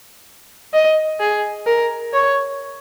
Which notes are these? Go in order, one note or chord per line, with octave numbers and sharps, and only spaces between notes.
D#5
G#4
A#4
C#5